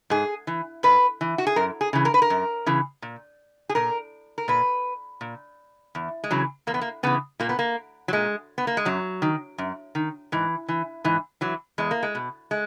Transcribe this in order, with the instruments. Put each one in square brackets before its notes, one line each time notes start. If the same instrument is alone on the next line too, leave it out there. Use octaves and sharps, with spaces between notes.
[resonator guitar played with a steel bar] G#2 G#4
E3
G#2 B4
E3
F#4
G#4
F#2 A#4
G#4
C#3 E3
A#4
B4
A#4
F#2
C#3 E3
A#2
G#4
A#2 A#4
A#4
A#2 B4
A#2
E2
G#3
C#3 E3 F#3
E2 A#3
B3
A#3
C#3 E3 B3
A#2 A#3
B3
A#3
F#3
A#2 G#3
B3
A#3
G#3
F#2 F#3
D#3
F#2
D#3
G#2 E3
E3
G#2 E3
E3 F#3
E2 G#3
A#3
G#3
B2
G#3